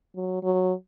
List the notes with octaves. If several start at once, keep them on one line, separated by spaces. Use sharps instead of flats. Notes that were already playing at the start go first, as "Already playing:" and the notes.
F#3
F#3